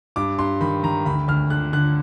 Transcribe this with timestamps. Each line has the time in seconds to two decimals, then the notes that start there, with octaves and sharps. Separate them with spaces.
0.16 G2 D6
0.39 G2 C6
0.61 D#3 B5
0.83 D#3 A#5
1.05 D2 B5
1.28 D2 F6
1.50 D3 F#6
1.73 D3 F#6